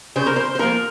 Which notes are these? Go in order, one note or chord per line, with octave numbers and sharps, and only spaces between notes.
C#3 C5
A#4
C5
C5
F3 A#3 A#4